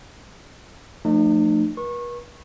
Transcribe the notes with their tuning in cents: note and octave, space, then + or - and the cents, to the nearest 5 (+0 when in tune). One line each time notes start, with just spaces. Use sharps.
F3 +0 A3 +20 D#4 -45
B4 -45 C#6 -25